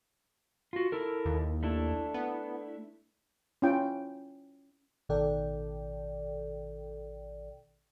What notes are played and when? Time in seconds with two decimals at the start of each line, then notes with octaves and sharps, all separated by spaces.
0.73 F4 F#4
0.92 E4 A4 A#4
1.25 D#2
1.63 A3 D4 E4
2.14 B3
3.62 C#4 E4 F4 G5
5.09 A1 B2 D#3 A4 D5 G5